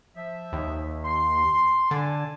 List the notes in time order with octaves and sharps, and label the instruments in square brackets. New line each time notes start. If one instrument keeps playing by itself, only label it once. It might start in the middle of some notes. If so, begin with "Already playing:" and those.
[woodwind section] F3 E5
[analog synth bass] D#2
[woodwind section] C6
[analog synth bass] D3 [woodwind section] G#5 A5